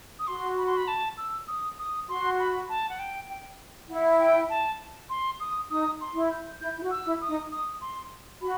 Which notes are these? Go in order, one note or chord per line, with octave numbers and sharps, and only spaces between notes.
D#6
F#4 C6
B5
C6
B5
A5
E6
D#6
D#6
F#4 C6
B5
A5
F#5
G5
G5
E4 F#5
G5
A5
C6
D#6
D#4 D#6
C6
E4
G6
E4 G6
E4
F#4
E6
E4
D#6
D#4
D#6
C6
F#4 B5